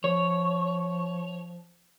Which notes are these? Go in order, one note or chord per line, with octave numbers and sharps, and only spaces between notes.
F3 C#5